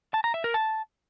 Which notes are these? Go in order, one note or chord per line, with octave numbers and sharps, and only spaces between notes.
A5
A#5
E5
A#4
A5